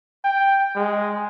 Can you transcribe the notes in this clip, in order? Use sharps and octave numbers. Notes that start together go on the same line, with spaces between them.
G5
G#3